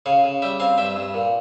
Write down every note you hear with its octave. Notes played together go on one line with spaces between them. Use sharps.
C#3 C#5 F5
C#3
G3 E5 G5
C4 F5 G#5
G2 E5 G5
G2
A#2